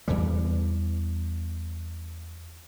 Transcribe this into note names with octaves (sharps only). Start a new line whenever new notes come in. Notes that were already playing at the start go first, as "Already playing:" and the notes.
E2 E3 G3